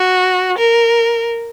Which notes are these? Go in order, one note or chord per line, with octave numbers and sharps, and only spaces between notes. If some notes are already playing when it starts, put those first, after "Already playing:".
Already playing: F#4
A#4